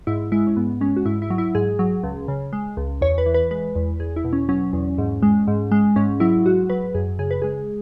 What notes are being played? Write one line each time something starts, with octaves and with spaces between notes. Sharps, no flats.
G#2 E4
G#3 E4
C#4
G#2 B3
G#3 C#4
F#4
G#2 E4
E4
F#3
E4
G#2 G#4
F#3
C#2
C#3
G#3
C#2
E2 C#5
B4
E3
B4
G#3 B4
E2
E2 G#4
E4
B2
C#4
F#3 C#4
E2
G#2
G#3
G#2
G#3
G#2 C#4
F#3 E4
G#2 F#4
F#3 B4
F#2 G#4
C#3 G#4
B4
G#3 G#4